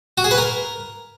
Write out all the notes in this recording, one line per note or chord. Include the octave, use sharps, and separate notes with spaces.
F#4
G#4
B4
A#4